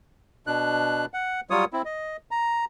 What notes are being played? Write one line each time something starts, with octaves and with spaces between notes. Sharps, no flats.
B2 D4 F#6
F#5
F#3 G3 F4 C#5 D#6
C4 E4
D#5
A#5